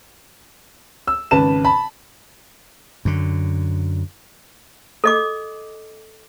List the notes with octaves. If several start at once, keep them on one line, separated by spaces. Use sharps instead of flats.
E6
G#1 C#3 B4 A5 E7
A5 B5
F#2 D3
A4 D#5 D6